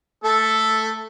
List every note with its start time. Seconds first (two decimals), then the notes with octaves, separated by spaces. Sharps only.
0.24 A3 A4